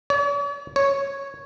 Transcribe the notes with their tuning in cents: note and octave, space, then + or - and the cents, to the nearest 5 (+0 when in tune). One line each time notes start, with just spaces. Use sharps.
C#5 +45
C#5 -5